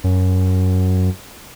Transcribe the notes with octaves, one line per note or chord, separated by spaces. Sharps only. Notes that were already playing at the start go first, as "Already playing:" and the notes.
F#2